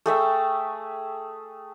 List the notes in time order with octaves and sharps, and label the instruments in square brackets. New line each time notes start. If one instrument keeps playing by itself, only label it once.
[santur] A3 G#4 E5 G5